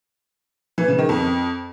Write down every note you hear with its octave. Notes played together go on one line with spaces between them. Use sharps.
E3
C#3
D#3
F2